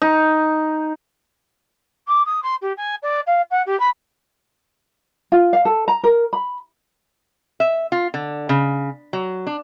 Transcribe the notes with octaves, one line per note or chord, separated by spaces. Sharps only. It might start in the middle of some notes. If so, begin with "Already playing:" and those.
D#4
D6
D#6
C6
G4
G#5
D5
F5
F#5
G4
B5
F4
F5
A4
A#5
A#4
B5
E5
F4
D3
C#3
F#3
D4